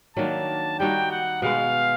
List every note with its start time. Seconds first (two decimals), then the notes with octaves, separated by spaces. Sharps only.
0.17 D#3 F#3 A#3 D4 A5
0.79 G3 A#3 D#4 F#4 G5
1.11 F#5
1.42 B2 G#3 B3 F5